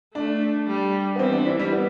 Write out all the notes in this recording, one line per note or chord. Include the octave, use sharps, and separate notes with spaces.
A3 D4
G3
B3
E3 C4
D4
E4
G3
B3